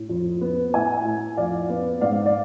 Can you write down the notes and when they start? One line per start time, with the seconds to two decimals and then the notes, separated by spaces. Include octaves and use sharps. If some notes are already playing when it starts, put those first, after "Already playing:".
Already playing: A2
0.09 F2
0.41 B3
0.74 A2 E5 G#5
1.05 A2
1.37 F2 D5 F5
1.70 B3
2.01 G#2 D5 F5
2.26 D5